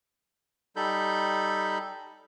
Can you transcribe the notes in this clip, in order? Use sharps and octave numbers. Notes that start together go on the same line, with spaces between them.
G3 D#4 A4 B5 G6